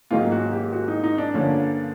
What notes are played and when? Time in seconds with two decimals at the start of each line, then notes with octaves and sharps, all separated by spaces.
0.11 G#2 D#3 F#3 A#3 C#4 F4
0.32 F#4
0.52 G4
0.73 F#4
0.88 D#4
1.04 D#4
1.18 D4
1.34 G2 D3 F3 A#3 C#4